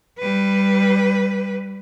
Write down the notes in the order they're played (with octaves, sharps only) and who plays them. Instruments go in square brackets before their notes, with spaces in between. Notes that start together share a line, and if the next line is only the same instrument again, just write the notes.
[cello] G3 B4